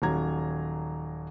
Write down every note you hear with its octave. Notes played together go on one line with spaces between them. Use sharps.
D#1 D#3 F#3 A#5 G#6